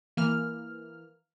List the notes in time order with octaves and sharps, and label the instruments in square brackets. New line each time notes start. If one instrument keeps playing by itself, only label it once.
[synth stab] E3 A#3 F6